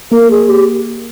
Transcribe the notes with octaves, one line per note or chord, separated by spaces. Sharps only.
A#3 A#4
G#4
G4